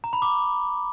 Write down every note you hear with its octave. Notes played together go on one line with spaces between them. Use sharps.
A#5
B5
D6